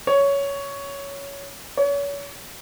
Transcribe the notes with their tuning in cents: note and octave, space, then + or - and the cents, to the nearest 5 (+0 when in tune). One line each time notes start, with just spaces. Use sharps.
C#5 +10
C#5 +35